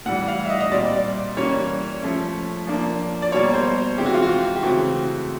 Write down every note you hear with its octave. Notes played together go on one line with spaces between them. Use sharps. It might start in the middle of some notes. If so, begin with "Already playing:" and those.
A2 E3 G3 F#5
F5
E5
D#5
D#5
A#2 G3 C4 D5
E3 G3 A#3 C#4 C#5
F3 A3 C#4
F3 A#3 D4
D5
B2 G3 A#3 C#5
C5
C3 E3 G#3 C4 G4
F#4
F4
F#4
G4
C#3 E3 A3 C4 F#4